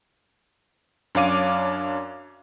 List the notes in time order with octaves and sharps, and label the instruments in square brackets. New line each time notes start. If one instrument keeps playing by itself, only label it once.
[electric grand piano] F#2 D4 C#5 F5 D6 D#7